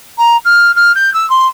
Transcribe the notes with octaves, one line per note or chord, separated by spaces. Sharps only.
A#5
F6
F6
G6
E6
C6